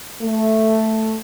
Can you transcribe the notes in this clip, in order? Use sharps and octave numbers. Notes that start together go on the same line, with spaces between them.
A3